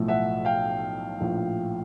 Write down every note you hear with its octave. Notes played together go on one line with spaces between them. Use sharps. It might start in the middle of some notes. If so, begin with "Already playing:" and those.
Already playing: B1 A2 F3 A3
E5 F#5
F5 G5
A#1 A2 F3 A3